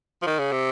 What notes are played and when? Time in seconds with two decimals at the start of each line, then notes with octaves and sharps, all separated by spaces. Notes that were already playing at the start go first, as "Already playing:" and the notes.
0.22 F3
0.26 D#3
0.39 C#3
0.52 C3